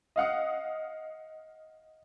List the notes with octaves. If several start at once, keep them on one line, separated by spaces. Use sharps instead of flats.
D#5 F5 F#5 D#6